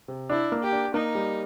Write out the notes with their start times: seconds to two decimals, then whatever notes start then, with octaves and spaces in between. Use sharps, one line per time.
0.08 C3
0.30 D4 E4
0.52 A#3
0.63 G4
0.72 D4
0.94 A#3 D#4
1.15 G3